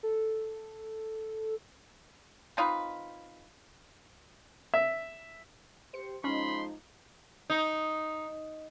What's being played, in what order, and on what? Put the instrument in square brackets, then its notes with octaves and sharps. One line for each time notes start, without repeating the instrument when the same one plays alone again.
[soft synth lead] A4
[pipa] C4 D#4 F4 B4
[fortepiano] E5
[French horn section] G4 C5 [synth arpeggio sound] C#7
[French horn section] F3 G#3 D#4 [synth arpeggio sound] C#4 [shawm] B5 [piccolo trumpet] C6
[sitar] D#4